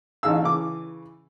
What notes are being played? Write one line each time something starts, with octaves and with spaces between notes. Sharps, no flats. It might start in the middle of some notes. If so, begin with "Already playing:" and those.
A1 D#4 G#4 F5 E6
C#3 E3 D6